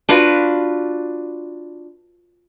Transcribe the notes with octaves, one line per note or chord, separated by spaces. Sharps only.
D4 F4 F#4 B4